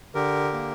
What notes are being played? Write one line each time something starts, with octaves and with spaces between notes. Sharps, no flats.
D3 G4 A#4
A#3